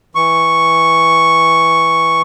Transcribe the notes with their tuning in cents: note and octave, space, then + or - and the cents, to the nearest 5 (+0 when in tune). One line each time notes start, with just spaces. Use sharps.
E3 +0 C#6 +0